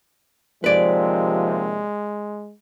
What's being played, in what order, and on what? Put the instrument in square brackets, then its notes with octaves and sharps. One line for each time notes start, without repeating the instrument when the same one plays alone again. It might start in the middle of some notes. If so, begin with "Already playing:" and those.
[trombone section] D#2 C3 [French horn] F3 [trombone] G#3 [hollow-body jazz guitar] B4 D5